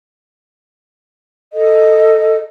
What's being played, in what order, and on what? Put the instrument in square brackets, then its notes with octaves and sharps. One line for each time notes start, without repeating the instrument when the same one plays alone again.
[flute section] A4 D#5